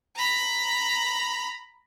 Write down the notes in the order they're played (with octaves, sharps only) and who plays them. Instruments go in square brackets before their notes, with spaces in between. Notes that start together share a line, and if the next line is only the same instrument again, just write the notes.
[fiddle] A#5 B5